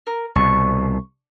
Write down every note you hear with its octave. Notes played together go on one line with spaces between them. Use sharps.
A#4
C2 B2 C#6